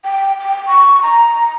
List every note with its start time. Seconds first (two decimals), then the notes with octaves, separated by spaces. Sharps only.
0.05 G5
0.39 G5
0.68 C#6
1.03 A#5